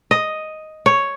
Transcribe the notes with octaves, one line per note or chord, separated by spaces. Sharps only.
D#5
C#5